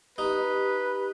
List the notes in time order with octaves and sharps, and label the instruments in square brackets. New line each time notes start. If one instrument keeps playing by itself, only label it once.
[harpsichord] D#4 [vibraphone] G4 [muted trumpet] B4